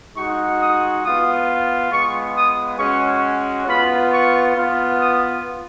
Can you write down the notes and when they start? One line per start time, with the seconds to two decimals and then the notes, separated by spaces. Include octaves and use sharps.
0.16 G#3 D#4 F#4 C#6
0.60 D#6
1.04 B3 F4 D#6
1.91 G#3 B3 F4 C#6
2.36 D#6
2.79 G#3 C#4 F#4 C#6
3.68 B3 F4 B5
4.12 C#6
4.55 B3 F4
4.99 D#6